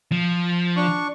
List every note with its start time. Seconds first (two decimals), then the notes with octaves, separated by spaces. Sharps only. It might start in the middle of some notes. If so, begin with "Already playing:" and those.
0.12 F3
0.76 D4 C#6